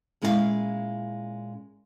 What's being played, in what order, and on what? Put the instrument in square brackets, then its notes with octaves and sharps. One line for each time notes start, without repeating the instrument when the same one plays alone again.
[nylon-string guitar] A#2 G#3 C#4 E4 B4 F5